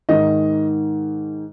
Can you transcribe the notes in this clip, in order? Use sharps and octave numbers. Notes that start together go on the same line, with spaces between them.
G#2 D#3 D#5